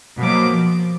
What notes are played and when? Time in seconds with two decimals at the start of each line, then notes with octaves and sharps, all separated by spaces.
0.18 B2 F#3 A#3 C5 D6
0.50 F3